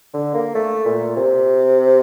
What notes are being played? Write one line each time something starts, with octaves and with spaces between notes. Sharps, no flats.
D3
A#3
A3
A#2
C3